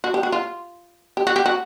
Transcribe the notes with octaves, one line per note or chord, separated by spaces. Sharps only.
F#4
G4
F#4
F4
G4
F#4
G4
F#4